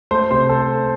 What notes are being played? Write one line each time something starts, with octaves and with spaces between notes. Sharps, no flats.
A3 C5
C3 C5
A4